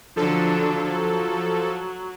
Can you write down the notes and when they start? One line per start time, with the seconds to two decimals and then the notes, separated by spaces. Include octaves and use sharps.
0.16 D3 F3 F#3 D4 A4
0.84 F#3